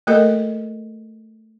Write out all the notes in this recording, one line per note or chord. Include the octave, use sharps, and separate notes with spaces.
A3 A#3 F#4 A4 A#4 D#5